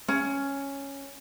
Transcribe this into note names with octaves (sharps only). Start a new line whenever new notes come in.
C#4